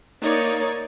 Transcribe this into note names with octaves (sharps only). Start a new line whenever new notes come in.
A#3 D#4 C#5 D5